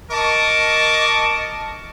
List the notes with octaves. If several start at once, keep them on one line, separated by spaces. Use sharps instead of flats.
A#4 D#5 A5 C#6 D6